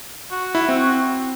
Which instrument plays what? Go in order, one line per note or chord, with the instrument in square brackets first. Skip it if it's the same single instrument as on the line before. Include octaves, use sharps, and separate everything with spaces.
[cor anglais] F#4
[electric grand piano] E4
C4